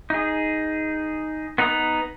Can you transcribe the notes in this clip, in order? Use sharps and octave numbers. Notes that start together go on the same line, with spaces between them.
D#4 G#4
B3 D#4 B4 A#5 D#6